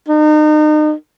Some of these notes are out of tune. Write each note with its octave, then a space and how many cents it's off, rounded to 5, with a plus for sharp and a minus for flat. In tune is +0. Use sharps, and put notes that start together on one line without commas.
D#4 -35